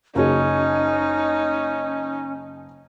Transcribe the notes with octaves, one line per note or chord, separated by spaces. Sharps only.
F#1 C#4 D#4 F#4 G#4